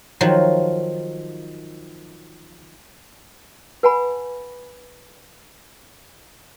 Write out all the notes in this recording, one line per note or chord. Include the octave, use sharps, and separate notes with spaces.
D#3 F3 F#3
B4 F#5 G#5 A5 B5